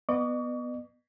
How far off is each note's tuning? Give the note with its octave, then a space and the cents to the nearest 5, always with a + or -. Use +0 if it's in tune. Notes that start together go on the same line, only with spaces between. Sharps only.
B3 +0 D#5 -40 C#6 +35